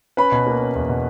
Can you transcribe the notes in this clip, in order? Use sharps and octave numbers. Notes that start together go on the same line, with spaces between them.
C#4 B4 B5
B2
A#3
C#4
E2
B2